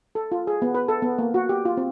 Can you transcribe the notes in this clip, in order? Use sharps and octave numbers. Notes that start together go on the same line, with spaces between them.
A4
F4
G#4
B3
B4
A4
B3
A#3
F#4
G4
F4
C4